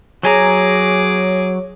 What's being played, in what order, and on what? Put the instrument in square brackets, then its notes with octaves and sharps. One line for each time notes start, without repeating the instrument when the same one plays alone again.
[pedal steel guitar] F#3 G#5 A#5 [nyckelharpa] G#4 D6 [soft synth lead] C#5